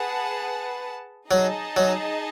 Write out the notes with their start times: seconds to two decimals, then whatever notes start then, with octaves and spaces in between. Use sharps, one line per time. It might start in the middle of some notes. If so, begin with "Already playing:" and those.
Already playing: G#4 B4 F#5 A5
1.30 F#3 D#4 G#4 D#5 A5
1.77 F#3